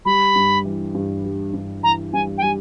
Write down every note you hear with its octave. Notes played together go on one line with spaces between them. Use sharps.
G3 B5
G2
E3
G2
G3
G2
E3 A#5
G2 G#5
G5
G3 G#5